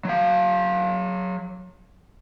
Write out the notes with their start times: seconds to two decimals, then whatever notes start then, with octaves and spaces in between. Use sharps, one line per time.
0.05 F#3 F5